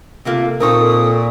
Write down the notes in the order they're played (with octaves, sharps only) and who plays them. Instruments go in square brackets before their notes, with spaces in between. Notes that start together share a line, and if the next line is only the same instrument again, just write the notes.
[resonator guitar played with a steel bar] C3 A3 A#3 [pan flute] F4
[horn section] A#2 [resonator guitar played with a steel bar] C4 D#4 A4 [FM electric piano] A#4 C#6 [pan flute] D#6